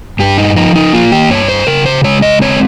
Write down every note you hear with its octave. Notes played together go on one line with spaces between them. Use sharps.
G2 G4
D#4
F3 D#4
D#4
A#3 F4
G4
G2 C#5
C5
C#3 A#4
C5
G#3 C#5
D#5
C4 C#5